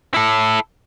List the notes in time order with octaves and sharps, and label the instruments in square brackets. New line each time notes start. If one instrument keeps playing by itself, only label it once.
[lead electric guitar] E4 A4